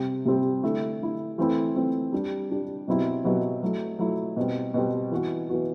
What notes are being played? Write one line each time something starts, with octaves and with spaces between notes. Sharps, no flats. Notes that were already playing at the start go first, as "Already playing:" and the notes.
Already playing: C3 G3 C4
C3 G3 C4
D3 A3 E4
D3 A3 E4
E3 A3 C4 E4
E3 A3 C4 E4
G3 D4 G4
G3 D4 G4
B2 F#3 C4 E4 G4
B2 F#3 C4 E4 G4
F#3 A3 E4
F#3 A3 E4
B2 G3 C4
B2 G3 C4
E3 B3 F#4
E3 B3 F#4